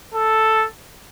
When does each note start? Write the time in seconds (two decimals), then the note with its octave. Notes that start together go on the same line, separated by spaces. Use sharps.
0.14 A4